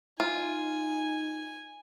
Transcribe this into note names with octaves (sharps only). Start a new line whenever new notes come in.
D#4 F4 G#5